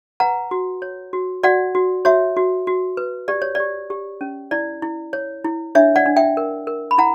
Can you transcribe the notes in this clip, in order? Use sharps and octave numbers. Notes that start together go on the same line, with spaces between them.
B4 F#5 A#5
F#4
C#5
F#4
F#4 D5 F#5
F#4
F#4 C#5 E5
F#4
F#4
B4
G4 D5
C#5
G4 D5
G4
C#4
E4 D5
E4
C#5
E4
D4 C#5 E5
D5 F#5
D4
E5 G5
A#4
A#4
B5
E4 F#5 A#5